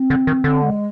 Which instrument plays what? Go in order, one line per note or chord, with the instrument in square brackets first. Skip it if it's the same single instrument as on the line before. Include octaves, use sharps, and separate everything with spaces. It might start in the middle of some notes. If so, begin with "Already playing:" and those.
Already playing: [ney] C4
[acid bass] D3
D#3
D3
[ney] G#3